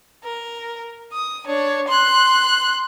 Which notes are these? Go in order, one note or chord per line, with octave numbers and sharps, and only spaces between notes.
A#4
D#6
D4 C#5
C6 F#6